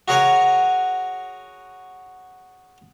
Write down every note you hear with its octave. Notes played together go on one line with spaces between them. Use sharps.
F#4 G#4 A#4 C#5 F#5 G#5